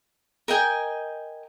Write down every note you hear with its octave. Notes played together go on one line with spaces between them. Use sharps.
A#4 D#5 G5 G#5